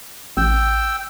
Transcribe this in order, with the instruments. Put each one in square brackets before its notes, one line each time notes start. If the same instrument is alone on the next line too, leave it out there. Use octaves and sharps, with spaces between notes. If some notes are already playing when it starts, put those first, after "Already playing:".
[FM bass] A1 [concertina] G5 E6